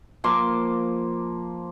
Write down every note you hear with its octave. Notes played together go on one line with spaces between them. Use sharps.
F3 A#3 C6 D6